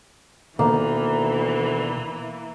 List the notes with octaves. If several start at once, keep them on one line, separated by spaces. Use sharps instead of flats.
D2 B2 D#3 E3 A#3 B3